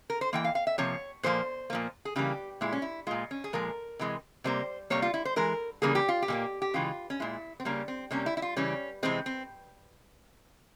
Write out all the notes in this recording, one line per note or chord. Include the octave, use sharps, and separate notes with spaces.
A#4
C5
E3 A#3 G5
F5
F5
E5
C3 F3 A#3 C#5
A#2 F3 A#3 C5
A#2 F3 A#3
G#4
C#3 E3 G3 A#3 G4
A#2 G#3 E4
C#4
E4
A#2 G#3 F4
C#4
G#4
A#2 F3 G#3 A#4
C3 E3 G#3
C3 G3 A#3 C5
C3 G3 A#3 C#5
F4
E4
C5
E3 G#3 A#4
C#3 E3 G3 A#3 G#4
G4
F4
G4
A#2 G3 A#3
G4
C#3 E3 G#3 F4
C#4
A#2 G#3 E4
C4
C#3 G3 A#3 C#4
C4
C3 G3 A#3 C#4
E4
E4
F4
C#3 E3 G3 C#4
C3 E3 G#3 C4
C4